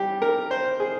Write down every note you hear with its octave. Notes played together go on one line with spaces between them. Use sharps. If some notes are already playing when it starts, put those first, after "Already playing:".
Already playing: G3 G4
A#4
C5
G#4